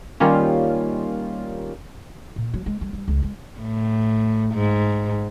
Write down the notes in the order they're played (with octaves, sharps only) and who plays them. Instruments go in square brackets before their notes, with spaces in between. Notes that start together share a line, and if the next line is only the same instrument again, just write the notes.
[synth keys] D#3 G3 A#3 C#4 F4
[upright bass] A#2
F#3
G#3
G3
G3
C#2
G#3
[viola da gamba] A2
G#2